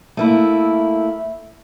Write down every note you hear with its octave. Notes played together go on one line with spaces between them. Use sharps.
A3 A#3 E4